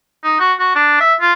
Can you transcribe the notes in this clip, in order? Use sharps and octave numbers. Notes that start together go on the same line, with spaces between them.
D#4
F#4
F#4
D4
E5
F4